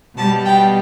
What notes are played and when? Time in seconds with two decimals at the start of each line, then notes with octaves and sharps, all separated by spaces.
0.17 B2 G3 A5
0.45 G5